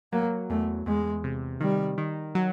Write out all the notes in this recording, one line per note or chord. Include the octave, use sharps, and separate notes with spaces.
F#3 A#3
E2 A3
E2 G#3
C3
D#3 G3
D#3
F#3